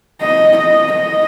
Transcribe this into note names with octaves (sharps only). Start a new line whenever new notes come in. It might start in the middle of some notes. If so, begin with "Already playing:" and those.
D#5
D#5
D#5